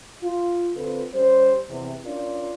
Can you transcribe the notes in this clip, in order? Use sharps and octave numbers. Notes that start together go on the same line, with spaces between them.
F4
D3 C4 F4 A4 B4
G3 C#4 C5
E2 C3
C#4 D4 F4 A#4 D5